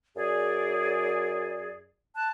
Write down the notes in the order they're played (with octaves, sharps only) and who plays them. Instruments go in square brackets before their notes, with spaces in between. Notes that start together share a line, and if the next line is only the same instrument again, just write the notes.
[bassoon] F#2 [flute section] G#4 D5
[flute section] A5 F#6